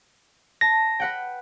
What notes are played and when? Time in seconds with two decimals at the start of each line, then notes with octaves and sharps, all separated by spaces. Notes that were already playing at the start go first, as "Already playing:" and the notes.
0.61 A5 A#6
1.00 B4 F#5 G5